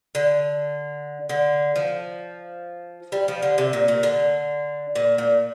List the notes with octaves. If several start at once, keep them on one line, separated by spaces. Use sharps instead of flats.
D3
D3
F3
G3
F3
D3
C3
A#2
A#2
D3
A#2
A#2